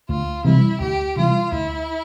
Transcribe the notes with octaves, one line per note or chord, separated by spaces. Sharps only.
D2 F4
C3 E3 G3 E4
D2 G4
C3 E3 G3 F4
D2 E4